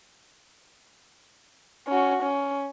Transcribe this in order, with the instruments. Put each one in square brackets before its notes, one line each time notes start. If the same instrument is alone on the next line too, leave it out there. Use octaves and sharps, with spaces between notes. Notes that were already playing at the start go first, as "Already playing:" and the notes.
[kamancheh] C#4 F#4
C#4